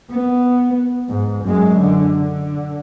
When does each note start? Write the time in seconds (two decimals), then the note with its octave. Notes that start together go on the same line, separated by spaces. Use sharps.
0.11 B3
1.09 G#2
1.44 F#2 G#3
1.80 D3
2.19 D3